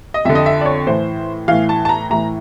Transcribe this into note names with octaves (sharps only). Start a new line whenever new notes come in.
D#5
F2 D3 E5
D#5
E5
D5
C#5
A2 E3 C5
A2 E3 F5
A5
A5
A#5
A2 E3 A#5